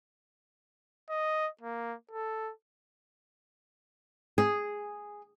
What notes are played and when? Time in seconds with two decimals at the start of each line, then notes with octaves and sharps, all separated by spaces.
1.10 D#5
1.62 A#3
2.11 A4
4.38 G#4